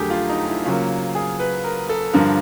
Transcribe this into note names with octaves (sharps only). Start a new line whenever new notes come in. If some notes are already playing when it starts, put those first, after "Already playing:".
Already playing: F2 D3 F#3 A3 G4 G#4 A#4
F4
D#4
E4
C#3 F#3 A#3 F4
G#4
B4
A#4
A4
G2 D3 F3 A#4